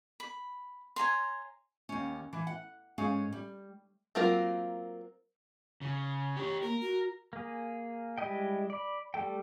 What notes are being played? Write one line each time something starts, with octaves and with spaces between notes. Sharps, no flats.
B5
C#5 G#5 A#5 C6
D#2 C#4
E3
F#5
G#2 C#4 G#4 F5
G3
F#3 A#3 C4 F4 A#4
C#3
G4 C#5
A#3 A#4
F#4
A#3 G#4
G3 G#3 E4 D#5 G5
D5 B5
G3 A3 A4 G5